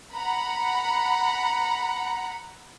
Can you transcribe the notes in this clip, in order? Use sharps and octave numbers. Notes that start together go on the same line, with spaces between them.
F#5 A#5 B5